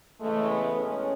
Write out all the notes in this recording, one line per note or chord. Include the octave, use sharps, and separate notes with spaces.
C#3 E3 G#3 A3
B3
A2 G#3 C#4